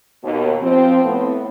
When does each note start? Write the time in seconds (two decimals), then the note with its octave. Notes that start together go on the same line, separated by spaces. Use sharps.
0.23 D#2 B2
0.62 F3 C4
1.04 A2 B3